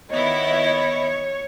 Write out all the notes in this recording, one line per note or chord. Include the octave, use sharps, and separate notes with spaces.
D#3 B3 E4 C#5 D#5